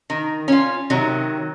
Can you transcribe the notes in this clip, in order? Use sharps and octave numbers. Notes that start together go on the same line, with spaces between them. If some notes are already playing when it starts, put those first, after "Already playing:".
D#3
C#4 F4
C3 D#3 F#3